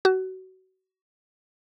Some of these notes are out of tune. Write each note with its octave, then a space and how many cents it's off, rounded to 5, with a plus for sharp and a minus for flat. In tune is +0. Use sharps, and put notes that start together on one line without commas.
F#4 +25